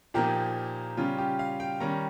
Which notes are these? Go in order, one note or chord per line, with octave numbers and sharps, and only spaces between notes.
A#2 F3 A#3 D#4 G4
C#3 G3 C#4 F4
G4
F5
G5
D#3 G3 C#4 A#5